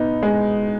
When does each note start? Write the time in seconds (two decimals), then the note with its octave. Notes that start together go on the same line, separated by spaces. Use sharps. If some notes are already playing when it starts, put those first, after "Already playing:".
Already playing: B2 B3 D#4
0.23 G#3